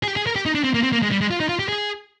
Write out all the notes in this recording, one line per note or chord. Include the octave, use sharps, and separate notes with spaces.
G#4
G4
G#4
A#4
G4
D#4
D4
C4
A#3
C4
A#3
G#3
G3
G#3
F4
D#4
F4
G4
G#4